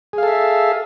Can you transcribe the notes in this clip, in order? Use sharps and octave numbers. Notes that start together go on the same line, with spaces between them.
G#4 A4 E5 F5